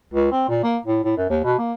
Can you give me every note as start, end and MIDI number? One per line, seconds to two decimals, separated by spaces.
0.13 0.29 37
0.31 0.48 60
0.49 0.62 46
0.63 0.78 58
0.86 1.01 45
1.04 1.15 45
1.17 1.29 42
1.29 1.42 39
1.43 1.54 47
1.58 1.73 58